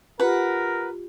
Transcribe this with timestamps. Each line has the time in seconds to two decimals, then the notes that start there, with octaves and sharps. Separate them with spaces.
0.20 F4 G4 A#4 B4 F#5